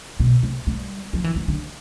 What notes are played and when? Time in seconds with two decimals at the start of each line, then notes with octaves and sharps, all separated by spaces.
0.20 B2
0.43 C3
0.67 G3
1.13 F3
1.24 E3
1.36 E3
1.48 D3